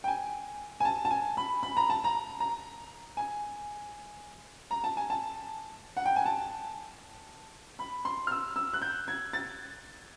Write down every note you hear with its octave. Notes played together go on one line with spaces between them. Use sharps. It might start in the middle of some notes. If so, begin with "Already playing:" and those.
G5
G#5
G#5
A5
A5
G#5
B5
B5
A#5
A5
A#5
A#5
G#5
A#5
A5
G#5
A5
F#5
G5
G#5
A5
B5
C6
F6
E6
E6
F#6
G6
G#6
A6